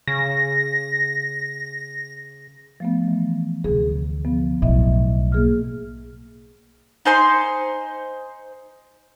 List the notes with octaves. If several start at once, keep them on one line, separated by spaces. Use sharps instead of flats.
C#3 A#6
F3 A3 B3
E3
D2 C3 G#4
F3 B3
B1 A2 D#5 E5
A#3 G#4 F6
D#4 C5 G#5 C6